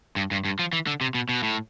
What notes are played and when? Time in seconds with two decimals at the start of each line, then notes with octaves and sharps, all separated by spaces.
0.16 G2
0.31 G2
0.45 G2
0.59 F3
0.73 E3
0.87 D3
1.01 C3
1.14 B2
1.29 B2
1.43 A2